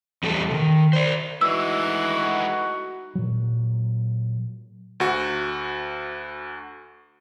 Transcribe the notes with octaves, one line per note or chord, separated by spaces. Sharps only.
E2 G3 A3 D4 A4
C3 D#3
C5 D5
E3 G#3 A3 D#4 E4 F#4 E6
A#2 F#3
D2 F#4